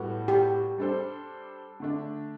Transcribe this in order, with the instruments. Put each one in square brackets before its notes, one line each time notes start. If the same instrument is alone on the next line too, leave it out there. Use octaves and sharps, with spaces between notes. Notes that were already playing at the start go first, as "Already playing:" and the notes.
Already playing: [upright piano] A2 G3 B3 F#4 A4
[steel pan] G4
[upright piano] G3 D4 A4 C5
D3 A3 D4